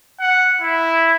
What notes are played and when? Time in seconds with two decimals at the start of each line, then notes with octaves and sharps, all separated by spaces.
0.20 F#5
0.61 E4